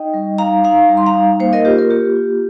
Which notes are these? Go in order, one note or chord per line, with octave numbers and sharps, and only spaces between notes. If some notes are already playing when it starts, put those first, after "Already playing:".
Already playing: D#4 D#5 G5
G3
D#4 F5 A#5
D#4 F5 A#5
G3
C6
F5 A#5
D#4
A#3 C5 F5
A#4 D#5
F4 G4 C5
A#4
A#3 G4
F4